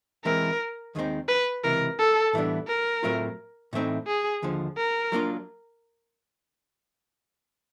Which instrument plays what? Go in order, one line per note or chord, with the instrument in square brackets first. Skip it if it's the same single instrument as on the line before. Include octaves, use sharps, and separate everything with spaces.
[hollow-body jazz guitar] E3 G#3 C4 E4 [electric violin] A#4
[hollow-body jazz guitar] D#2 D#3 G#3 C4 D#4
[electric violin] B4
[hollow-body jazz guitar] C#2 C3 E3 [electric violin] A#4
[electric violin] A4
[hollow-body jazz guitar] A2 E3 G3 B3 D4
[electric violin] A#4
[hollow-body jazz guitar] A2 F#3 A3 C4 F4
A2 E3 A3 C4 D#4
[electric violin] G#4
[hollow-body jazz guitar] D#2 D3 F3
[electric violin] A#4
[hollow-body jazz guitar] F#3 A#3 D4 F4